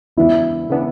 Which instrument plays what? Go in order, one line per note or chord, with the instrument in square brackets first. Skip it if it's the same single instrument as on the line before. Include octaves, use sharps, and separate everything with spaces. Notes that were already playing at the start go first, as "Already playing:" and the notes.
[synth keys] E2 C#3 E3 B3 D4 [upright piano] E4
[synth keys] C#3 E3 B3 D4